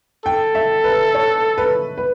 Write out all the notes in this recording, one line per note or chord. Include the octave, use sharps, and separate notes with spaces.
A4 G5
E5
B4
C#5
B4
B4